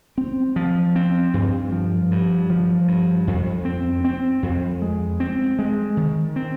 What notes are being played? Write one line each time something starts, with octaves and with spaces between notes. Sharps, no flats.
C4
F3
C4
G2
F3
G2
F3
G2
F2
C4
C4
F2
G#3
C4
G#3
D#3
C4